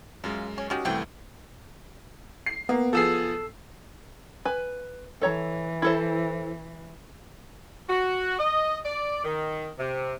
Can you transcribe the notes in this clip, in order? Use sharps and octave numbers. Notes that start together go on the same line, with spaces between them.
F#2 G#3 F4
C#4
D#3 G#3 C#4 F#4 G4
C2 E3 A3 C4 G5
C7
A#3 B3
F3 B3 G#4 A4 E6 C7
B4 G#5
E3 A4 C#5 A#5
E4 A4 C5
F#4
D#5
D5
D#3
C3